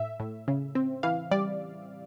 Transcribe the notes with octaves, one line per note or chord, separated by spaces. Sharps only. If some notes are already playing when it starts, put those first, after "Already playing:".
Already playing: A2 E5
A2
C#3
C4
E3 F5
G3 D5